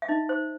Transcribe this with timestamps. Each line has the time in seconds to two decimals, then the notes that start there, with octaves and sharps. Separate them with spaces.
0.02 E5
0.08 D#4 D#5
0.29 C5